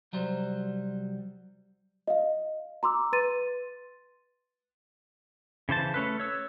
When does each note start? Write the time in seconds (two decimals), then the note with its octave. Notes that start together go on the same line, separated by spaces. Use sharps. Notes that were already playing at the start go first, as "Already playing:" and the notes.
0.13 C2 F#3 G3 C5
2.07 D#5 F5
2.83 A#5 C6 D6 E6
3.13 B4 C6 A6 D#7
5.69 C#3 E3 C5 A5
5.94 A3 C#4 A4 B4
6.20 C#5 E6